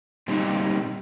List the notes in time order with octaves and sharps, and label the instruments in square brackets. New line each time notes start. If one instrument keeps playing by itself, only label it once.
[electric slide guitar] A#2 G3 C4 D#4 G4